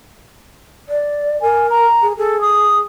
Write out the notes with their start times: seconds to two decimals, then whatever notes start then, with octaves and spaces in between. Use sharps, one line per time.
0.89 D5
1.41 A#4 G#5
1.70 A#5
2.02 G#4
2.18 G#4 A4
2.41 D#6